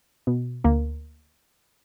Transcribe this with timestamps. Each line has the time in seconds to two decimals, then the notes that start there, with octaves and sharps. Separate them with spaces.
0.27 B2
0.64 D2 A#3